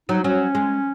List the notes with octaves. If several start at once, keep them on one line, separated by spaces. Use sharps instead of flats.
F#3 D#4
F#3 C#4
G#3